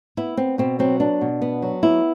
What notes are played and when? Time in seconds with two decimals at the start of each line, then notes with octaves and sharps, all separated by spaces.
0.17 B3 E4
0.37 B3 C4
0.58 B2 C4
0.79 F#3 C4
1.00 B3 D4
1.21 B2
1.42 B3
1.62 F#3
1.83 B3 E4